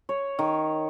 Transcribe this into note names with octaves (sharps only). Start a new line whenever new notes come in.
C#5
D#3